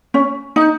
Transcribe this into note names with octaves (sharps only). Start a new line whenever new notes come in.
C#4
D#4